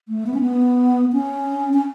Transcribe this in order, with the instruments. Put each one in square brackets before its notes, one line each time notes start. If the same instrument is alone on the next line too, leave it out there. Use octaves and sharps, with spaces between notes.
[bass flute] A3
B3
C#4
B3
C#4
C#4